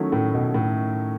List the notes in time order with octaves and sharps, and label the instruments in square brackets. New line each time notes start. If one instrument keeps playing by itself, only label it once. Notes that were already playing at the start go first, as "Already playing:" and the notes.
Already playing: [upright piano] D#3 F#3 A3 C#4 E4
[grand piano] A2
B2
A2